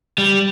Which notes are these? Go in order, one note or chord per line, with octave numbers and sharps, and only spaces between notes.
G3